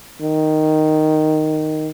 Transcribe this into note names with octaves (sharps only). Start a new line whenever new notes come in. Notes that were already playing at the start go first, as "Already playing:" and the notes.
D#3